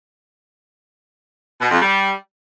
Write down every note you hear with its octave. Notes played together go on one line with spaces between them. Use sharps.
B2
F2
G3